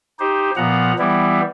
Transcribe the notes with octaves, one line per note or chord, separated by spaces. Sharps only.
D#4 G4 C5
A#2 F3 B3 F#5 A#5
E3 G3 B3 E4